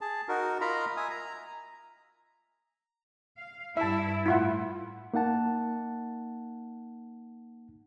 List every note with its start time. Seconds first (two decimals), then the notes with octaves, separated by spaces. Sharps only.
0.01 G#4 A5
0.28 D#4 F#4 A#4
0.61 F4 A#4 D#5 F5 A#5 B5
0.97 E5 G#5 D#6
1.10 A#5
3.37 F5
3.77 G2 E4 E5 A5
4.26 A2 E4 F4 F#5
5.14 A#3 D#4 F#5 A5